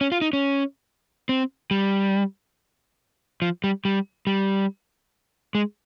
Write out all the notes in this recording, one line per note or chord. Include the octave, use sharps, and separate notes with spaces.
C#4
F4
D#4
C#4
C4
G3
F3
G3
G3
G3
G#3